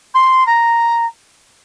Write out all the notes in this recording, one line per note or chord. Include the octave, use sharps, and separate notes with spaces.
C6
A#5